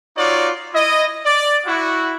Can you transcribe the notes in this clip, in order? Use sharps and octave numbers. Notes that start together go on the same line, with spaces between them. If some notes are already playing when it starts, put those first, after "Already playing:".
D#4 F4 F#4 C#5 D5
E4 D#5
D5
E4 F#4